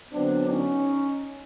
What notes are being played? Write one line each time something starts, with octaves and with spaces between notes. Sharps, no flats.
D3 F#3 B3 C4 D4
C#4 D#4